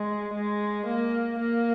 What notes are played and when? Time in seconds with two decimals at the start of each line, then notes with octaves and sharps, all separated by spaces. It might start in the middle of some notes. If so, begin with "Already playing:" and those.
Already playing: G#3
0.33 G#3
0.86 A#3
1.40 A#3